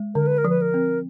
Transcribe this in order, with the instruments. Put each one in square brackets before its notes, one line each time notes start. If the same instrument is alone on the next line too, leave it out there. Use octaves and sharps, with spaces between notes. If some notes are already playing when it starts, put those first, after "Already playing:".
Already playing: [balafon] G#3
[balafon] D3 [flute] A#4
[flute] B4
A#4
[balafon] F3 [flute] B4
[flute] A#4
[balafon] C4